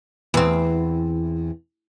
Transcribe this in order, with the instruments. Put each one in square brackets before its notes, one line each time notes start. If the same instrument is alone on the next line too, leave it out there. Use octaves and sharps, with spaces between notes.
[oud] E2 C4